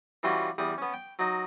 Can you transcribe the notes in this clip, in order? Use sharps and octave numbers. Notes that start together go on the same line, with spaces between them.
E3 G3 C#4 F4 F#4
E2 G3 D#6
B3 C#4
G5
F#3 D#4